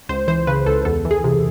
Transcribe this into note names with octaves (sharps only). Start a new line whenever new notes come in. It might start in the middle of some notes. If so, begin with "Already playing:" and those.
C#2 C5
E3 C5
C#3 B4
C#2 A4
E2 A4
E3
G#4
C3